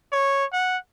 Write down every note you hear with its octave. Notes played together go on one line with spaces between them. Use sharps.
C#5
F#5